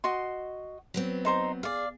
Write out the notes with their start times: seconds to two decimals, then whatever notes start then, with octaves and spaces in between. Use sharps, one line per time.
0.04 F#4 D#5 C6
0.94 F#3 B3 C4
1.25 D#4 C5 A#5
1.63 G#4 D5 F5